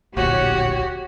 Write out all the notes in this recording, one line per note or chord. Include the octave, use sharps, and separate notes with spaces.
D1 A#1 F#4 G4 C#5